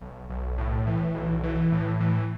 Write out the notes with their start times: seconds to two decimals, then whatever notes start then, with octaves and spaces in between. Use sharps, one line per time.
0.01 B1
0.30 B1
0.58 A2
0.87 E3
1.15 B1
1.43 E3
1.72 A2
2.01 E3